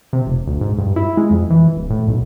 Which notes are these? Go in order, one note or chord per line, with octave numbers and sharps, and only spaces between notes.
C3
F1
D2
G#2
G2
E4
G#3
F2
E3
D1
A2
B1